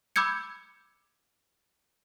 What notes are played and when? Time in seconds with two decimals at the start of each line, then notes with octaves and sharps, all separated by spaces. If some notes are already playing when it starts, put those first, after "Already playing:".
0.16 B5 D6 E6 G6 G#6 C#7